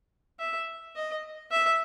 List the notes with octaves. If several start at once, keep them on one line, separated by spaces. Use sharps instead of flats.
E5
D#5
E5